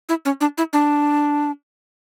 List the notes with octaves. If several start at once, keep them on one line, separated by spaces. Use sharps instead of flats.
E4
C#4
D4
E4
D4